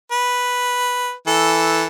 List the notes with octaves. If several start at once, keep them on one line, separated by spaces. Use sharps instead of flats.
B4
E3 A4